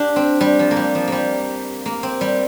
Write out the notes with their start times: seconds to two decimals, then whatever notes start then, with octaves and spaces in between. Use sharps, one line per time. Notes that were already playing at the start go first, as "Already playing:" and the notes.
Already playing: D4 G4
0.16 C4
0.41 G3
0.59 F3
0.71 A#3
0.76 G3
0.95 F3
1.08 G3 A#3
1.86 A#3
2.03 C4
2.21 G3